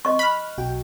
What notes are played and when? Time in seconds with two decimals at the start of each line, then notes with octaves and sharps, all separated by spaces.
0.05 D#5 C#6
0.19 B5 F6 F#6
0.58 B1 F#4 G5